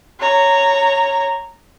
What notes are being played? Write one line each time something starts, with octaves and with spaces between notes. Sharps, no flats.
C#5 A#5